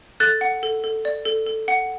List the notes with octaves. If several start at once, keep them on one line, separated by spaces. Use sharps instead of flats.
A4 F#6 A6
F#5
A4
A4
D5
A4
A4
F#5